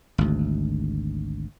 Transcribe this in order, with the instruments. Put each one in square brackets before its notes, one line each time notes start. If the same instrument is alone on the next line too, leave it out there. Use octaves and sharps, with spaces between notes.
[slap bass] G#1 D2